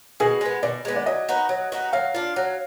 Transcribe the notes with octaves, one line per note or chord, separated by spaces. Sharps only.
B2 G#4
G#3 B3
B2 D5
G#3 B3
D5
F#3 D#5
B3 D#4 F#4
F#3
B3 D#4 F#4
F#3 F5
D4 F4
F#3